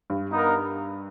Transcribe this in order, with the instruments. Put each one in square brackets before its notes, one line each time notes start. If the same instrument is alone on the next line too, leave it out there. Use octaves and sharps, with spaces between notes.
[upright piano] G2
[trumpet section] B3 D#4 A#4